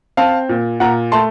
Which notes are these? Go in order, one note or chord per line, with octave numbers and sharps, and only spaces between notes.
C4 F5 A5
A#2
A#2 F#5 A#5
A3 A5 C6